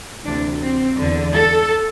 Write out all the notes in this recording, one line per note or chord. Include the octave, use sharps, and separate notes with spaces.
D2 C3 E3 D4
C4
E2 D3
A4